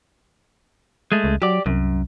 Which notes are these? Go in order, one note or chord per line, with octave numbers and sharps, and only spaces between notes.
G#3 A3
C#2
F#3 G4 D5
C2 F#2